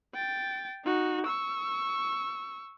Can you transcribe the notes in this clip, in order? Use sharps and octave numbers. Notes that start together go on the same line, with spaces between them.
G5 A6
D#4 F#4
C#6 E6